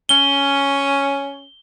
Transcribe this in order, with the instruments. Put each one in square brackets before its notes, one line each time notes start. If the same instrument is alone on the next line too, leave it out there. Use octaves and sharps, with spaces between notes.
[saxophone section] C#4 [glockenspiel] G7